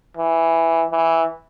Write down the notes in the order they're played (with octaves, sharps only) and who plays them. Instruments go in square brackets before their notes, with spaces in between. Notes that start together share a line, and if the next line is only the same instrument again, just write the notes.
[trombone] E3
E3